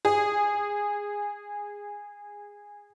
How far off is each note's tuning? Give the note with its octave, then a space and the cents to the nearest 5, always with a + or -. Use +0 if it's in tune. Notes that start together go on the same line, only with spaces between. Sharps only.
G#4 -15